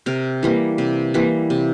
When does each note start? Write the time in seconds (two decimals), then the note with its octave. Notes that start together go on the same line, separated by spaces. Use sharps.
0.06 C3 A#4
0.43 E3 G3 A#3
0.78 C3
1.14 E3 G3 A#3
1.50 C3